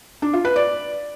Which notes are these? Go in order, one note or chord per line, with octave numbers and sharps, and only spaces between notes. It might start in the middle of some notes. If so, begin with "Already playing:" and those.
D4
F4
B4
D5